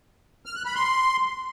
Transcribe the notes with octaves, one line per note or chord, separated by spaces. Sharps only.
F6
F#6
B5
C6